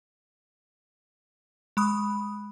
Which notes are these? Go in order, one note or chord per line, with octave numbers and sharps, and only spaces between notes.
G#3 B5 D#6